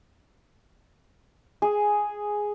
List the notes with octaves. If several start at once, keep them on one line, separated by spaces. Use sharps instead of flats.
G#4